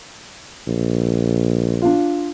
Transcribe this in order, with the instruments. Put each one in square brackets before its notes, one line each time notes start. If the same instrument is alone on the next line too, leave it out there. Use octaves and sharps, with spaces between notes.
[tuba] A#1
[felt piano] D4 F4